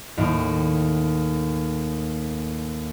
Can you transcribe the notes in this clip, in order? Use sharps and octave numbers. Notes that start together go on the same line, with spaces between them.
D#2 A2